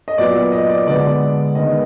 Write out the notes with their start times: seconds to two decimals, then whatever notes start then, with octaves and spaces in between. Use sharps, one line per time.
0.08 D#5
0.18 A#2 F#3 B3 D5
0.52 D#5
0.69 D5
0.87 D3 G#3 B3 D5
1.55 D#3 G#3 B3 D#5